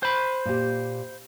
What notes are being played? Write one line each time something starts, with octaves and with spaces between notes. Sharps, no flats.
C5 B5
A#2 G4